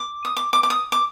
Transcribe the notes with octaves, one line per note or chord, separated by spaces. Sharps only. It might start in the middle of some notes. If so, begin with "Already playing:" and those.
Already playing: D6
D#6
D6
D6
D6
D#6
D6